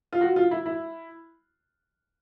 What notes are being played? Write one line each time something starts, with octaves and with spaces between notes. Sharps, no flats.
F4
F#4
F4
E4
E4